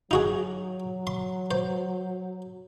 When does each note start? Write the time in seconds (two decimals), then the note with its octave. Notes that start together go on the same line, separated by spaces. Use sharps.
0.11 F#3 D#4 F#4 G#4
1.07 C6
1.51 C5